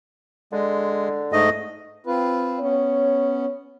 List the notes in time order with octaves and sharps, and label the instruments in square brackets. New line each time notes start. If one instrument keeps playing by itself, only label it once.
[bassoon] D3 [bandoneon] G#3
[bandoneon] G#2 A3 D#5
[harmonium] C4 F4 B4
[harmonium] B3 C#4 [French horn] C#5